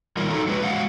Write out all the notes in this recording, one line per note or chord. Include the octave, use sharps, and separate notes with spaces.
D#3 G3 F4 A#4 C#5
F#3 D#4 A4
F#3 G#3 B4
F#3 G#3 F5 F#5